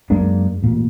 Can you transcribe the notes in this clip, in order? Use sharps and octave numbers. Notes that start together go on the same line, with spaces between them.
F#2 G#3 A#3 D4
A1 A#2